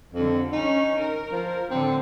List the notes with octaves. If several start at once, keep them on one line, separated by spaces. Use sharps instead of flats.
F2 D3 G3
C#4 D#4
A#4
F3
A2 D3 C4 D4